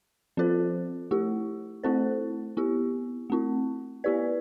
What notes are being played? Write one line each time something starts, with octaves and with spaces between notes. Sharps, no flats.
F3 C4 F4 A4 C5
A3 E4 G4
A3 C4 E4 A4 C5
B3 E4 G4
A3 C4 E4
B3 E4 G4 B4 D5